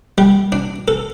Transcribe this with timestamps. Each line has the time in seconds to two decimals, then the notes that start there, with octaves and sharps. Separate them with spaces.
0.18 G3
0.52 D4
0.88 A4